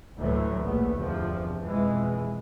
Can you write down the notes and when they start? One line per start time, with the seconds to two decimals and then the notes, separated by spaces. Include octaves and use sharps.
0.18 D2 A2 E3 F#3 A3
0.64 A#1 A3 B3
0.95 G1 E2 C3 F3
1.62 F2 B2 E3 G#3